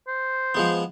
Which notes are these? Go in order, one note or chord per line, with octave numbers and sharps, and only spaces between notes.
C5
F3 G#3 B3